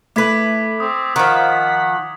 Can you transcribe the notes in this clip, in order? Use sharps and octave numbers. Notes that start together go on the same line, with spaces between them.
A3 E4 B4 D6 G#6 B6
C4 D#6
D#3 F3 F#5 B6